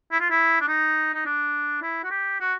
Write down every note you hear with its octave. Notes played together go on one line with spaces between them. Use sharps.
E4
F4
E4
D4
D#4
D#4
D4
E4
F#4
G4
F#4